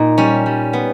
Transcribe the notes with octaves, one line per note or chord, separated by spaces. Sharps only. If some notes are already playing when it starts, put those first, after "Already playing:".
Already playing: A#2 D#4
G3 C#4
G3
B3